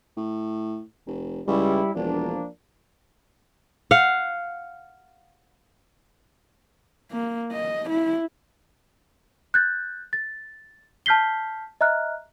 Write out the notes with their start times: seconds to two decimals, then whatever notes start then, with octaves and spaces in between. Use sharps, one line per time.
0.17 A2
1.07 F1
1.47 C#2 G3 E4
1.95 E1 F3 A#3 D4
3.91 F5 F#5
7.11 A#3
7.53 D#5
7.90 E4
9.54 F#6 G6 A6
10.13 A6
11.06 A5 F6 G6 B6 C7 G7
11.81 D#5 E5 A#5 F6 F#6